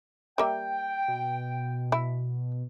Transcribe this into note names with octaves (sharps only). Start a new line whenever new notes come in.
G3 A#3 E5 G5
B2
E4